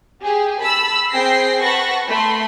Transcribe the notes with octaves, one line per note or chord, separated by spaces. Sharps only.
G4 G#4
A5 B5 E6
C4 G#4 G5 A#6 C7
B4 F#5 A5 B5 C#6 A#6
A3 B5 C6